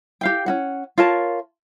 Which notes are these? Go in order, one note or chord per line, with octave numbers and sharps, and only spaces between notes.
G4 F5 G5
C#4 F#4 F#5
F4 A#4 C#5 A5